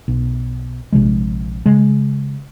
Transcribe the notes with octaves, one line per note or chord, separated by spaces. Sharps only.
B1
A#1 C3 F3 G#3
C#3 G#3